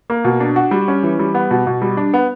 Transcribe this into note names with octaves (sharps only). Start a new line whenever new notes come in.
A#3
B2
D4
F#4
G3
C#4
E3
G3
B3
B2
B2
G3
D4
B3